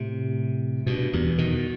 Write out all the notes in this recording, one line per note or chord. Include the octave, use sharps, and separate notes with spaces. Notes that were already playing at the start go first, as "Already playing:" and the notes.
Already playing: A2 C3
G2 B2
E2 G2
B2 D#3